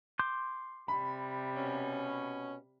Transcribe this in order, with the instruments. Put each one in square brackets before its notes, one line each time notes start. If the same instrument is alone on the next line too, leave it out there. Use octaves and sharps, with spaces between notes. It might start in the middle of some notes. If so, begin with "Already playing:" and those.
[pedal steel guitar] C6 D6 G6
[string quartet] C3 G3 [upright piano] B5
[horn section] B2 C#4